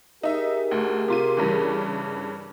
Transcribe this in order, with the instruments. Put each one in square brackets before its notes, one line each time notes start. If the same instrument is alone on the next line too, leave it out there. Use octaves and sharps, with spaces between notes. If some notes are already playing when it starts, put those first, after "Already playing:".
[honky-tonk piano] D#4 E5 [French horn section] G4 G#4 A#4
[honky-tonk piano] D2
C3 F4 D#7
G2 C#3 E3